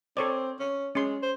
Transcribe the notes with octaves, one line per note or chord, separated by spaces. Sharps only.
C4 A4 C#5 D5
C#4
G#3 C#4 C6
C5